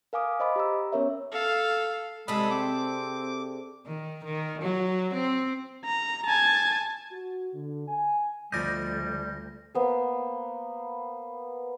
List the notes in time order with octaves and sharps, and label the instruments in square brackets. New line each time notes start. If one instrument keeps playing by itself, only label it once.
[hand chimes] A#4 F5 G#5 D6 D#6
C5 D#5 B5 D6
G4 A#5 E6
B3 C#4 A#4 C#5 E5
[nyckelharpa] A4 F5
[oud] C3 [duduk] G#3 [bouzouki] D4 G#4 A4 [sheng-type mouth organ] B5 D#6
[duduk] C4 [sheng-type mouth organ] D6
[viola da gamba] D#3
D#3
F#3
C4
[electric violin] A#5
G#5 A5
[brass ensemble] F#4
D3
G#5
[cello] D2 [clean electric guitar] F3 D5 D#5 [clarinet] G3 [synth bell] G6 A#6
[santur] A#3 B3 C5